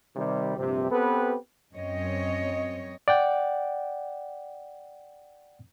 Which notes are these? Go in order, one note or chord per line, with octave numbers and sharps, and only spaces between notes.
C3 D#3 G3
A#1 G2 C3
B3 C4 G4 A4 B4
F#2 C4 C#5 D#5
D5 F#5 G5